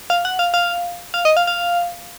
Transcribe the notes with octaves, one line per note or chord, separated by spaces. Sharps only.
F5
F#5
F5
F5
F5
D#5
F5
F5